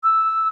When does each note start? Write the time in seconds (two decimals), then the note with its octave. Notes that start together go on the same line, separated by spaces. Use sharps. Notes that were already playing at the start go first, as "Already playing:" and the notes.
0.03 E6